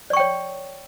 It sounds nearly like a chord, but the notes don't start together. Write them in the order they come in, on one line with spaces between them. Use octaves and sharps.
D5 C#6 G5 C#5